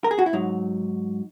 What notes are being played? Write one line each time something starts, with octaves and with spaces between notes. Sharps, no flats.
A#4
G#4
F#4
E4
G#2 F#3 D#4